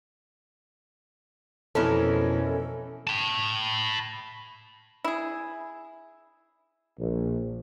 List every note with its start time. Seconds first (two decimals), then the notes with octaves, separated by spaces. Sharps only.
1.75 F2 B2 E3 C#4 E4 A4 A#4
3.07 A5 B5
5.05 E4 G#4
6.99 A#1